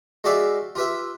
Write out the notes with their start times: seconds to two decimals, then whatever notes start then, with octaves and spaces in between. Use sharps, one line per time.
0.24 G#3 F#4 G4 D5 E5 F5
0.75 F4 G4 B4 E5